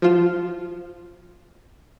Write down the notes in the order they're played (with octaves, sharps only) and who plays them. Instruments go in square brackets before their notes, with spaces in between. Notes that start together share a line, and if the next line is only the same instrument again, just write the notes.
[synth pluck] F3 F4 E7